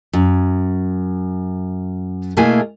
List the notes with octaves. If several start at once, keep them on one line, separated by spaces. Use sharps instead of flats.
F#2
B2 A3 A#3 E4 G#4 G#5